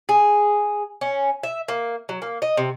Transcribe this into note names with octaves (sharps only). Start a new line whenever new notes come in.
G#4
C#4
E5
A#3
F#3
A#3
D#5
C3